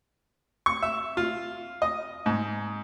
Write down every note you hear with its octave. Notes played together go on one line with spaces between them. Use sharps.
C#6
E5
F4
D#5
G#2